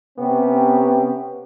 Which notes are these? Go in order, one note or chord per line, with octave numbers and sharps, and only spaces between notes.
C3 B3 C#4 G4